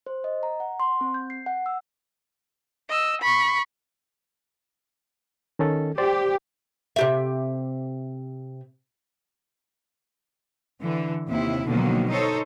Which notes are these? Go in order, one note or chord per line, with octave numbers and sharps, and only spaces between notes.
C5
D#5
A#5
F#5
C6
C4
G6
C7
F#5
E6
D#5 E6
B5 C#6
D#3 C#4 A4
G4 C5 D5
C3 G4 E5
D3 E3
D#2 C3 E4
B2 D3 D#3 F3 F#3 A#3
D#4 A4 C5 C#5